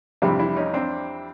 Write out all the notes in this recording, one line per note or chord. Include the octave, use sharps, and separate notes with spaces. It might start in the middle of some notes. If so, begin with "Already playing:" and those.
F2 C3 E3 G3 D4 E4
D4 E4
C#4 D#4
C4 D4